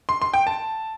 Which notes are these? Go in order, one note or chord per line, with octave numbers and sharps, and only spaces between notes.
C6
C6
G5
A5